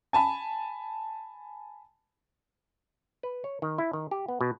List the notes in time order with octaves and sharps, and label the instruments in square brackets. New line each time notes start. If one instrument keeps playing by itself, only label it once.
[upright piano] G#5 A5 B5
[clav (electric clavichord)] B4
C#5
D#3
E4
D#3
G4
B3
B2